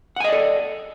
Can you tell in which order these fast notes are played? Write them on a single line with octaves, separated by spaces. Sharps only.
F#5 G#5 D#5 D5 A4